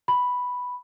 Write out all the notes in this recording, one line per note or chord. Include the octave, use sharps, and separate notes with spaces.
B5